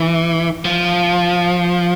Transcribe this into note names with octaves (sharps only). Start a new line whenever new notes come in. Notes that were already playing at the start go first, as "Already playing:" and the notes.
Already playing: E3
F3